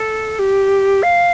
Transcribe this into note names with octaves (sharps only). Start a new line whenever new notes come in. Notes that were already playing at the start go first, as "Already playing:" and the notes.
Already playing: A4
G4
F5